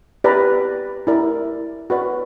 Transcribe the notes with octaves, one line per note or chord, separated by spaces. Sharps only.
G4 B4 D5 A#5
E4 A#4 D5
F#4 B4 D5